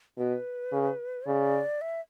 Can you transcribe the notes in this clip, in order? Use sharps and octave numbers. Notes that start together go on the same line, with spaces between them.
B2 B4
C#3
C#3 D5
E5